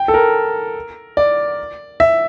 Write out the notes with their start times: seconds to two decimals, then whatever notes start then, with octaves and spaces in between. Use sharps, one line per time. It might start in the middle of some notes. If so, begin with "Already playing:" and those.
Already playing: G5
0.08 A4
0.14 A#4
1.17 D5
2.00 E5